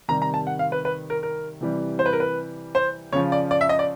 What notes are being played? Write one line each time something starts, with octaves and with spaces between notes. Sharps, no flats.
C3 D#3 G3 A#5
A#5
A5
F#5
F5
B4
B4
A#4
A#4
C3 E3 G3
C5
B4
A#4
B4
C5
C#3 F3 C#5
D5
D5
E5
D#5
D5